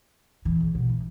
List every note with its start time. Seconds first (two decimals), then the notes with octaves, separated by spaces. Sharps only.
0.45 E3
0.60 C#3
0.75 B2
0.89 E3